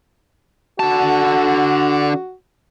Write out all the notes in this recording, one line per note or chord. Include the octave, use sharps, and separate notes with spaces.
D3 F#4 A5